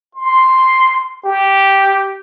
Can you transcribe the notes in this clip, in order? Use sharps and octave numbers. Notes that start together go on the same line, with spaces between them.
C6
G4